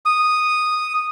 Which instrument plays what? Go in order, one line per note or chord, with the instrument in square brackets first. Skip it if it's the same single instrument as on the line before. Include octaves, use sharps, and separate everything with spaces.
[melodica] D#6